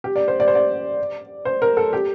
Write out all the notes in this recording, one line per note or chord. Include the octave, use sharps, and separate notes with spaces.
G4
D5
C5
D5
C5
D5
C5
A#4
A4
G4